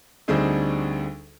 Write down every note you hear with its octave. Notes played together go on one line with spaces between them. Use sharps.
D2 D3 G3 C4 D#4 G#4